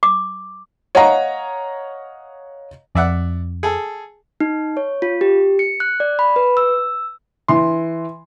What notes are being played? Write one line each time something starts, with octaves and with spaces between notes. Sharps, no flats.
D6
C#5 D#5 F5 F#5 A#5
F2 D5 E5 F#5
G#4 A4
D#4
C#5
F4
G4
C#7
F#6
D5
B5
B4
E6
E3 C6